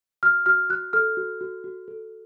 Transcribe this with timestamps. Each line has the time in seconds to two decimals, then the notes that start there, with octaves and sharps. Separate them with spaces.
0.23 F#4 F6
0.46 F#4 F6
0.70 F#4 F#6
0.93 A4 F6
1.17 F#4
1.41 F#4
1.64 F#4
1.88 A4